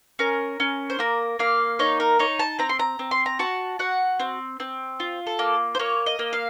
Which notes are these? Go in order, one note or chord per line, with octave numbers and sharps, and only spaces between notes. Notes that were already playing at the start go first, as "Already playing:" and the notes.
C#4 A#4
C#4
C5
A#3 A#4
A#3 F5
D#4 C#5
A#4
D#4 C#5
A5
C4 A#5
C6
A#5
C4
C6
A#5
F#4 A5
F#4 F#5
C4
C4
F4
A4
A#3
C5
A#3 C#5
D#5
A#3
F5